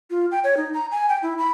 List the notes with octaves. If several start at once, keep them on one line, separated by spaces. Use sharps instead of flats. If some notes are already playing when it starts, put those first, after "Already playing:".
F4
G5
C#5
D#4
A#5
G#5
G5
E4
B5